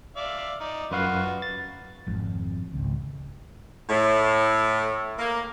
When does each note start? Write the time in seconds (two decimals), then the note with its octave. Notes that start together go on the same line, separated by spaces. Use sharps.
0.17 D5 E5 F5
0.60 D#4 D5
0.91 F#2 F4 F#4 B4 F5
1.42 A6
2.07 G#1 F2
2.74 G#1 C#2
3.89 A2
5.18 A#3